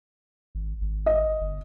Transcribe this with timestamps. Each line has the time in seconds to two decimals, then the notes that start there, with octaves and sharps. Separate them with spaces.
0.55 G#1
0.81 G#1
1.06 D#5
1.41 G1